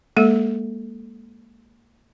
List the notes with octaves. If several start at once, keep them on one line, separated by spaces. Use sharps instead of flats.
G#3 A#3 A4